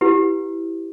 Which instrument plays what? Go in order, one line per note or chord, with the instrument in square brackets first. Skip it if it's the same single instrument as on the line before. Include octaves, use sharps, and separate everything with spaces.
[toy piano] E4 G4 B4